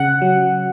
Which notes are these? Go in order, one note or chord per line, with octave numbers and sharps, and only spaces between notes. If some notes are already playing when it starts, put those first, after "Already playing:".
Already playing: C#3 F#5
F#3